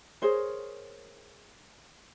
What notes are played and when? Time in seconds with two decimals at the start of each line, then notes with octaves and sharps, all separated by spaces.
0.22 G#4 A#4 C5 C#5